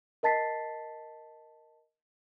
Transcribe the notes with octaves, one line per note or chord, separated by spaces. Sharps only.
A#4 D#5 A5 A6 B6 C7